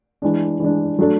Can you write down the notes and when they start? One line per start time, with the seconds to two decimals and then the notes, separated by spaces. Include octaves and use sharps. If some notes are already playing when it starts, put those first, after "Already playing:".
0.22 E3 G#3 D4
0.60 E3 G#3 D4
0.99 F#3 A3 D4 A4